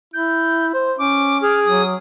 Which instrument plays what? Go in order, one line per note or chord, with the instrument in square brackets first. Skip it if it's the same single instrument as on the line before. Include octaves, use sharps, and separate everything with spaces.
[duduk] E4 [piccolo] G6
[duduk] C5
[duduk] C#4 [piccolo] D6
[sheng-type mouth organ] G#4 [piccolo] F6
[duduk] F#3 [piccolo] D#6